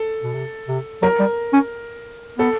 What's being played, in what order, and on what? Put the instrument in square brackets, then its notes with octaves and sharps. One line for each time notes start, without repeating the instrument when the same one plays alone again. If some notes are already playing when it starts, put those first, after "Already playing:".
Already playing: [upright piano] A4
[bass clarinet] B2
C3
C3
[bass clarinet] F#3 [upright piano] A#4
[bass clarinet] G3
C#4
[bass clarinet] B3 [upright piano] A4